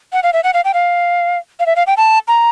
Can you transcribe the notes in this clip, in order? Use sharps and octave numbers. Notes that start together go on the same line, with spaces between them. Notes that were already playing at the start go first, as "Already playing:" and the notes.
F#5
F5
E5
F#5
F5
G5
F5
F5
E5
F5
G5
A5
A#5